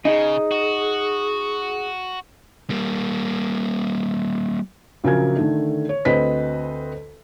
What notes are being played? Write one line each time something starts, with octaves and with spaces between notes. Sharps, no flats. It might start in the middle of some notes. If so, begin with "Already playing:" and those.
C#3 D#4 G#4
F#4
G3 A#3
A#1 C#3 F#3 A#4 G#5 G#6
D3 D#3 A3
C#5
D2 C4 B4 C5 D#5 B6